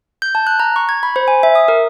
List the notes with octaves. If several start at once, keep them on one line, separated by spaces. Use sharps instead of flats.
G6
A5
F#6
A#5
C#6
G#6
B5
C5
G#5
E5
D#6
A#4